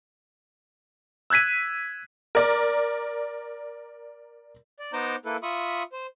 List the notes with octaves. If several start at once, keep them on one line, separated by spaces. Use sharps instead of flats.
E6 F#6 G#6 B6 D#7
A#4 D5
D5
B3 D#4 C5 A#5 D6 G6
A#3 E4 A4 B4
F4 E5 B5 C#6 D#6
C5